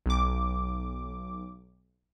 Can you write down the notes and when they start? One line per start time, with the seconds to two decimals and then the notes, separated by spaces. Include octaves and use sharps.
0.06 B1 D6